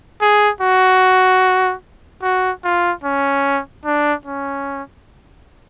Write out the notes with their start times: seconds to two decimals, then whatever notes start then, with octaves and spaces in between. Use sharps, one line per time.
0.21 G#4
0.61 F#4
2.23 F#4
2.64 F4
3.04 C#4
3.85 D4
4.26 C#4